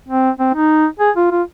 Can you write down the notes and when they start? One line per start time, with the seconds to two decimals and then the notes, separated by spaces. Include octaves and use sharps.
0.09 C4
0.40 C4
0.54 D#4
1.00 G#4
1.16 F4
1.31 F4